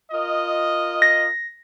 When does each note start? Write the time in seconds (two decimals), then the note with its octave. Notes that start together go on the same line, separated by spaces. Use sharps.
0.12 F4 A#4 D#5
1.02 A#6